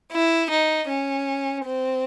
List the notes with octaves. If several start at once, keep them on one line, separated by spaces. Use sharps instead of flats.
E4
D#4
C#4
C4